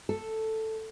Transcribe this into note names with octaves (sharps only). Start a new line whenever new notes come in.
A4